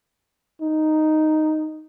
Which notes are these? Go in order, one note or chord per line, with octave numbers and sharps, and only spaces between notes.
D#4